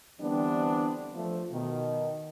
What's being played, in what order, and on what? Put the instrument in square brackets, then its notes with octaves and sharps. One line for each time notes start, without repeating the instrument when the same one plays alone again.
[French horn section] D3 E3 G3 B3 C4 D4
F3 A3
B2 D#3